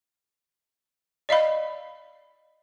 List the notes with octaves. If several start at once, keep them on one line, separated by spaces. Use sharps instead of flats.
D5 D#5 F5 B5